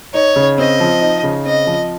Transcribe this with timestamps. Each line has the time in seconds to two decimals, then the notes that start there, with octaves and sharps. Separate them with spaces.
0.14 D#4 C#5
0.36 C#3
0.58 C4 D#5
0.80 F3
1.01 D#4
1.23 C#3
1.45 C4 D#5
1.67 F3